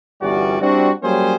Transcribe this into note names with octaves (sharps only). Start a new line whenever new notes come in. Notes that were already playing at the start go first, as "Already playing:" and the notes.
G1 E2 G3 C#4 F#4 D5
G3 C4 D4 E4 F#4
F#3 G3 A#3 C#4 G#4 C5